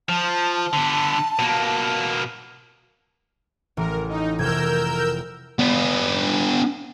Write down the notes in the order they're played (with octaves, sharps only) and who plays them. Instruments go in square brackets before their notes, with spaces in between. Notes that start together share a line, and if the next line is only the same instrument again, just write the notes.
[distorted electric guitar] F3 [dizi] A5
[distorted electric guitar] D3 B3
B2 A#3
[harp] A1 [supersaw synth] A#4
[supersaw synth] D#4
[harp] F1 G#6 [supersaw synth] A#4 E6 G6
[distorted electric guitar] B3 D4